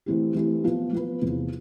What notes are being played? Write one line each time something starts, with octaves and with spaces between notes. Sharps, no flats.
E3 A3 C4 E4 G4
E3 A3 C4 E4 G4
F3 B3 F4 B4
F3 B3 F4 B4
E2 C3 F3 C4